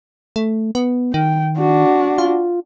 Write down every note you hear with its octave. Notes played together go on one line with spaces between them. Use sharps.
A3
B3
D#3 G5
D4 F#4
F4